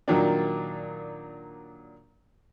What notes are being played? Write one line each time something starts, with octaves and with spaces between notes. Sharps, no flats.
A#2 D#3 F#3 D4